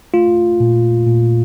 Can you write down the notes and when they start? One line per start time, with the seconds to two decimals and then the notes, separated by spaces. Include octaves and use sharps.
0.14 A3 F4
0.60 A#2
1.06 A#2